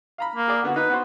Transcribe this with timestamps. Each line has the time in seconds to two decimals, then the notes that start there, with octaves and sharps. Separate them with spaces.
0.18 F5 A#5 B5
0.36 A#3
0.48 G#4 D5
0.63 D3 B3 F#4
0.76 D#4 B4
0.90 B3 F#4 C5